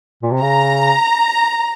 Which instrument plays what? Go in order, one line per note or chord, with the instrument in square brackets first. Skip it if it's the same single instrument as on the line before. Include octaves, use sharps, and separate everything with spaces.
[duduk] A#2
C3
[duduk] C#3 [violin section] A#5